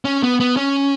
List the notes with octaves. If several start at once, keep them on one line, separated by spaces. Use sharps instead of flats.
C#4
B3
B3
C#4